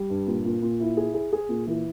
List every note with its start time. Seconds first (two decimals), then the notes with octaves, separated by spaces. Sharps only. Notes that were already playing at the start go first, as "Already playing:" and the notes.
Already playing: G3
0.10 G2
0.27 A#2
0.45 A#2
0.62 A#2
0.80 E4
0.97 G#4
1.14 G#4
1.33 G#4
1.49 A#2
1.67 E3